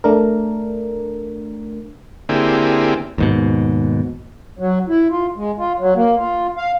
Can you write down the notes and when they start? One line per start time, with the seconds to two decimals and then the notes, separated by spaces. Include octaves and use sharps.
0.04 A3 D4 A#4
2.29 D3 A#3 C4 E4 G4 G#4
3.18 D#2 G#2 B2
4.59 F#3
4.89 E4
5.10 F4
5.36 G#3
5.58 F4
5.80 F#3
5.96 A#3
6.18 F4
6.57 F5